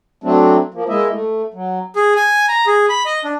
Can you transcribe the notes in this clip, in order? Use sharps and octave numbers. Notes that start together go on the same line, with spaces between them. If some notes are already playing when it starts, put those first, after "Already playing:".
F#3 A3 C4 D4
F3 A#3
G#3 A#3 E4 D#5 E5
A3
F#3
G#4
G#5
A#5
G#4
B5
D#5
D4